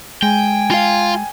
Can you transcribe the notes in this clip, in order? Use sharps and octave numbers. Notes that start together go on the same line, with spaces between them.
G#3 G5 G#5
F4 F5